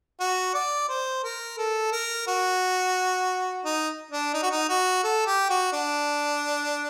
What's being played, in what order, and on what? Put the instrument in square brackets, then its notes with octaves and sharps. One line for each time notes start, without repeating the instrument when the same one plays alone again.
[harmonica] F#4
D5
C5
A#4
A4
A#4
F#4
D#4
D4
D#4
F#4
D#4
F#4
A4
G4
F#4
D4